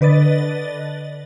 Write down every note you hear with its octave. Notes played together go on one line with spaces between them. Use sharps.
D3 B4 D5 D#5 A6